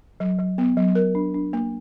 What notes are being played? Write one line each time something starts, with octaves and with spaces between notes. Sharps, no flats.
F#3
F#3
B3
F#3
A#4
D4
D4
A#3